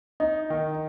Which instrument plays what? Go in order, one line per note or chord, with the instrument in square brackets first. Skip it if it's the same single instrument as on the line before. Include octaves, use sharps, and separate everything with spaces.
[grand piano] D#4 [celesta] D#5
[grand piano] D#3